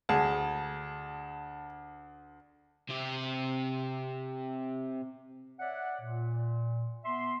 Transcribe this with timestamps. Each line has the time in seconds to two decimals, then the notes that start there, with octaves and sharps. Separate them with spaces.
0.09 D2 G#4 A5
2.89 C3 G4
5.60 C#5 D5 E5 F#5
6.01 A#2
7.05 B3 E5 C6